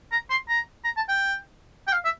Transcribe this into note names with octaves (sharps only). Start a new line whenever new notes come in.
A#5
C6
A#5
A#5
A5
G5
G5
F5
E5